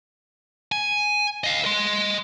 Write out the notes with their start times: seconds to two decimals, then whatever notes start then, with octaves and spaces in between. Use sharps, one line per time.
0.72 G#5
1.44 D#5 F5
1.65 D#5 C6